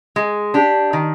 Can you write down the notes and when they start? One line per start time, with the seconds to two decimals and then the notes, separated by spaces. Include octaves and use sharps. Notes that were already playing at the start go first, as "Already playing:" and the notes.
0.16 G#3
0.54 D4 G4
0.93 D#3